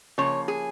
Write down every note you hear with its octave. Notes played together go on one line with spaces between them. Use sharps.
C#3 F3 A#3 C#5
G#4